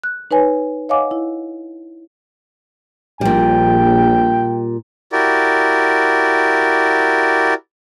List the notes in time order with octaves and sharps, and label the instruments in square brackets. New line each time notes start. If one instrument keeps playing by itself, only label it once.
[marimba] F#6
D#4 B4 C#5 G#5
C#5 D#5 F5 F#5 G#5 D6
E4
[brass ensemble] A#1 [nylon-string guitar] A#2 G3 [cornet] G5
[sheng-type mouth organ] E4 F#4 G4 A#4 D5